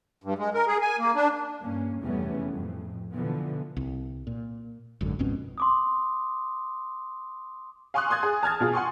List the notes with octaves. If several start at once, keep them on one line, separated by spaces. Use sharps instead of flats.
G2
G#3
A#4
G#4
G#5
A#3
D4
G2 A#3 C#4
F1 E2 G3 A3 B3 C#4
F2 A2
B2 D3 E3 F3 B3
C2
A#2
G#1 F#2 D3
G#1 F2 B2 C#4
C6 D6 D#6
F5 G#5 C6 C#6 D#6 F#6
C6 D#6 G#6 A6
G#4
A5 F6 G#6 A6
B2 F4 G#4
F#5 G#5 C6 C#6